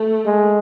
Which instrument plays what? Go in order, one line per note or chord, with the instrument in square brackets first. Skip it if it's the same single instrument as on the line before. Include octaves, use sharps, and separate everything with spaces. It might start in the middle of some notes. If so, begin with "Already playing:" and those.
Already playing: [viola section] A3
[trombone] G#3